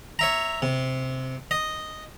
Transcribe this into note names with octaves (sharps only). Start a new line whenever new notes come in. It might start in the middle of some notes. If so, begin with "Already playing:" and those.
C#5 E5 A#5
C3
D#5